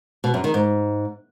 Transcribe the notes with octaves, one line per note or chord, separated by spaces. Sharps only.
B2
F#2
D#3
G#2